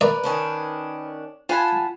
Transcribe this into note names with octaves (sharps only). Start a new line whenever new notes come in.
A#4 B4 D5
D#3 C#4 D4
F4 F#5 G#5 A5 B5